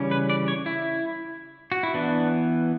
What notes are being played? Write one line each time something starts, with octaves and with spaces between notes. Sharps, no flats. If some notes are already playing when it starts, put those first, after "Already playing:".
Already playing: C#3 E3 G3 C#4
B4
D5
C#5
E4
F#4
E4
E3 B3 D4